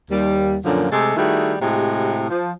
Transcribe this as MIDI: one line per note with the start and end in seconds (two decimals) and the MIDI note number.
0.11 0.56 39
0.11 0.56 55
0.65 0.89 42
0.65 0.89 46
0.65 0.89 50
0.65 0.89 53
0.65 0.89 54
0.92 1.13 48
0.92 1.13 56
0.92 1.13 57
0.92 1.13 69
1.16 1.54 51
1.16 1.54 55
1.16 1.54 57
1.16 1.54 64
1.16 1.54 66
1.16 1.54 68
1.61 2.24 45
1.61 2.24 48
1.61 2.24 56
1.61 2.24 66
1.61 2.24 67
2.29 2.52 53